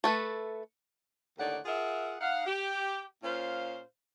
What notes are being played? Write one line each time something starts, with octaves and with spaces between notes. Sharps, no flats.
A3 A4 B4
D#2 A2 D3 D#4 D5 F#5
F4 G#4 A#4 E5 F#5
D#4 F5 F#5
G4
A#2 C#4 F4 C5 F5